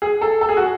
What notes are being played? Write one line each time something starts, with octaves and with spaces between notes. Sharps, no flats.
G#4
A4
A4
G#4
F#4